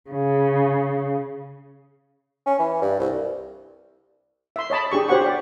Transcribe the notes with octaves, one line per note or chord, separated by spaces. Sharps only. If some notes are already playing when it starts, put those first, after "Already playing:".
C#3
C#4
E3
G2
C2
E5 C6
C#5 D#5 A5 B5
D4 G4 G#4 C#6
F#4 G4 C5 C#5 F#5 C#6
G4 D5